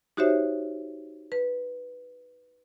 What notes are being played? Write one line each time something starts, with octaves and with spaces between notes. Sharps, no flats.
D#4 F#4 G4 C5 C#5 E5
B4